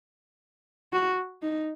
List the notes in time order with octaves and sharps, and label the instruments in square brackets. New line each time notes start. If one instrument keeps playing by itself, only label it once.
[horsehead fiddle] F#4
D#4